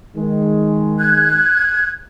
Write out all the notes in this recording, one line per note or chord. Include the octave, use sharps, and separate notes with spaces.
D#3 G#3
F#6 G#6